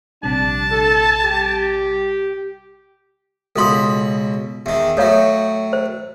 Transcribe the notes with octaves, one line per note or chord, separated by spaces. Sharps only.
A#1 C3 G3 D4 A5
A4
G4
C#2 B2 A4 B5 C6 D#6
E2 D#3
A2 F#3 A4 C#5 F5
C5